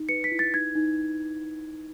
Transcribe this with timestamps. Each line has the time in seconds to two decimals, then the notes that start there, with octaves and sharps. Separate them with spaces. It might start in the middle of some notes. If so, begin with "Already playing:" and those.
Already playing: D#4
0.09 B4 C#7
0.24 B6
0.32 E4
0.39 A6
0.54 D#4 G#6
0.75 D#4